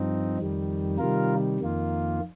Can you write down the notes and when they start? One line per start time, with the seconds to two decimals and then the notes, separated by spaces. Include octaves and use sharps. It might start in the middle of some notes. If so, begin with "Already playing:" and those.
Already playing: G2 F3 C4 D#4
0.38 F2 D#3 G3
0.98 C3 D#3 G3 F4 A#4
1.60 F2 D#3 A#3 F4